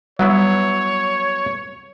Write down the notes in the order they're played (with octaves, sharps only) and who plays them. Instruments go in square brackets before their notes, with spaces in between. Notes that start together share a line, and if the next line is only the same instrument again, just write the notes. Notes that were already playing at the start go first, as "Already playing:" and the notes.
[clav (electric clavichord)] F#3 B3 E4 [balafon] G3 [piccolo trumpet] C#5